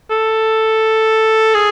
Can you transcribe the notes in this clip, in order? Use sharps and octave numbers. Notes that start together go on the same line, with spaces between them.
A4
G#4